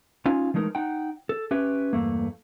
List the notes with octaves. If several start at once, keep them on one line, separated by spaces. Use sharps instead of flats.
C#4 D#4 F4 F5 G#5
E3 G#3 A3 D#4 A#4
D#4 F#5 G5
A4
C#4 G4 B4 E5
E2 G2 A3 A#3